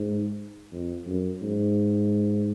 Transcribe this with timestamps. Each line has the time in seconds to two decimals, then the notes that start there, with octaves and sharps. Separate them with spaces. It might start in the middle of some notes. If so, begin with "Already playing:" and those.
Already playing: G#2
0.72 F2
1.07 F#2
1.42 G#2